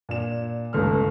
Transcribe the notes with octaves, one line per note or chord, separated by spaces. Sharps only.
A#2 D4 E7
G1 C#2 A3 D#4 F6